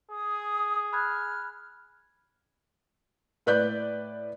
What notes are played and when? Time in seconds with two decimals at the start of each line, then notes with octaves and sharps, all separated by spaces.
0.11 G#4 D#6
0.93 B5 F6 F#6 G#6
3.46 A2 B4 D5 F#6 G6